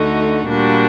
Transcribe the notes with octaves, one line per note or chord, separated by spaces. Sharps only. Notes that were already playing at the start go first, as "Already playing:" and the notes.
Already playing: D2 D3 A3 D#4 F#4
A#2 G3 D4 F#4